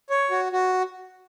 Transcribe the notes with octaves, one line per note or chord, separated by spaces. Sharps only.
C#5
F#4
F#4